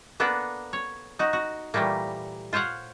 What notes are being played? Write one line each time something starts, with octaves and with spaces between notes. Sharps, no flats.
A#3 B3 D4 A4
C#5
D#4 F#4
F#4
A#2 E3 G3 A3 A#3
F4 C5 C#5 F5 F#5